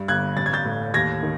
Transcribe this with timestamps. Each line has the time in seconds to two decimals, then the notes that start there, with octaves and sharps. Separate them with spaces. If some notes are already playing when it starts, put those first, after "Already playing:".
Already playing: G2
0.08 G1 F#6 G#6
0.36 A1 A6
0.46 G#6
0.53 G6 A6
0.65 A2
0.94 D#2 G#6 A#6
1.23 D#3